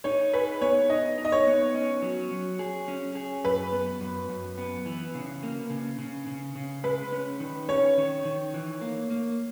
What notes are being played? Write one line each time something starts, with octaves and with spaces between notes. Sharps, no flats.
D#4 C#5
G#4 B4
B3 C#5
D#4 D#5
D#4
D#5
C#5
B3
C#4
F#3
F#3
G#4
C#4
G#4
F#2 B4
B3
F#2
F#2
B3
E3
C#3
A#3
C#3
C#3
C#3
C#3
G#3 B4
C#4
D#3
C#4 C#5
D#3
D#3
E3
A#3
A#3